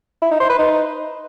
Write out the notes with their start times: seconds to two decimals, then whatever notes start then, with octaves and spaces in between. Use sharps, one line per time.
0.22 E4
0.31 D#4
0.40 C5
0.49 B4
0.59 D#4